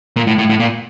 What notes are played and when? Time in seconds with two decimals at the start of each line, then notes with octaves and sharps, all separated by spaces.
0.16 A#2
0.27 A2
0.38 A2
0.49 A2
0.60 A#2